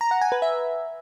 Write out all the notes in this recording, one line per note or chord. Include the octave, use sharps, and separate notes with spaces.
A#5
F#5
G#5
B4
E5